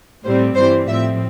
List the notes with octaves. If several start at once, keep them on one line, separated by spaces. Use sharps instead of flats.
A2 G3 C4 C5
G2 E3 G3 C4 C5
A2 F3 C4 E5